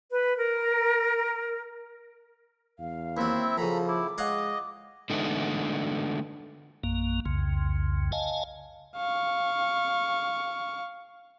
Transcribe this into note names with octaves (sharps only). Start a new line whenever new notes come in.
B4
A#4
E2 F5
D#2 F#3 C4 E4 E5
F#2 C#3 F3 A4 A#5 B5
E4 D6
G#3 C#5 D#5 F5 F#5
D3 G#3 A3 B3 D4 D#4
A#1 F#2 A#3
C2 F2 C#3
D#5 F5 G#5 A5
F5 C#6